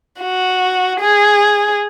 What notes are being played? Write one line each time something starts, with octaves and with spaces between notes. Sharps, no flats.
F#4
G#4